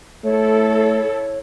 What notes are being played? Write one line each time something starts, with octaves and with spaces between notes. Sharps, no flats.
A3 E4 A4 C#5